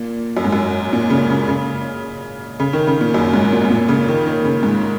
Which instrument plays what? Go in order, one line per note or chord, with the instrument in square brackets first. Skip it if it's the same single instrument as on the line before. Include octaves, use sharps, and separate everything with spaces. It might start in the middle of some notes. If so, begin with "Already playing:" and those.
Already playing: [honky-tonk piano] A#2
F#2
G#2
F#2
A#2
C#3
C#3
C#3
C#3
D#3
C#3
A#2
F#2
G#2
A#2
G#2
A#2
C#3
D#3
D#3
C#3
G#2